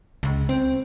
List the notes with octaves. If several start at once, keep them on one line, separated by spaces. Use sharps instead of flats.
C#2
C4